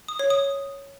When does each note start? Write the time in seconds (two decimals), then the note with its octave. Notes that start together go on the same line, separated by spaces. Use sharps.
0.08 D#6
0.19 C#5
0.30 D#6